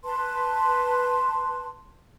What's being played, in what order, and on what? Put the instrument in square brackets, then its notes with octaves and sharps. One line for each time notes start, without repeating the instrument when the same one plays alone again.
[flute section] B4 A5 C6